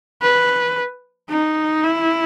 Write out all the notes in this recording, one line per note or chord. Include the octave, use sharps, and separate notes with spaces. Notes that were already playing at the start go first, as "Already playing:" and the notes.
B4
D#4
E4